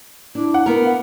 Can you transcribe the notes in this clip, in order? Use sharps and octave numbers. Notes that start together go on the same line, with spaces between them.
D4 E4
F#5
B3 A#4
F5